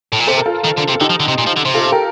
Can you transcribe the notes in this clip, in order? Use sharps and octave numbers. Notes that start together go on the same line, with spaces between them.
A2
A#2
C3 A4 C5
A#4
F4 A4
D#3
D3
C3
A4
D3 D#4 G4
F3
D3
C3
A#2
F3
D3
C3
F4 A4
G4 A#4